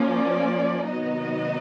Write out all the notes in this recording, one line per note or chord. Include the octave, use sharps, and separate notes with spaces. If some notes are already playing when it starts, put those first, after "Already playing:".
Already playing: F3 A#3 C#4
D5
C3 D#3 F#3 B3 D#4 D#5